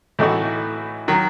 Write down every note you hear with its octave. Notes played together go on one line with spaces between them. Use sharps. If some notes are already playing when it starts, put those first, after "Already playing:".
A2 E3 A3 D#4 F#4
D#3 F#3